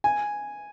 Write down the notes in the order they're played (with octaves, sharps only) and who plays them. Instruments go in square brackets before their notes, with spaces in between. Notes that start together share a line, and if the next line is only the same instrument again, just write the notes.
[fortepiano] G#5